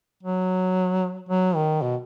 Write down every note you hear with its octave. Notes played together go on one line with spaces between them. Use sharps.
F#3
F#3
D#3
B2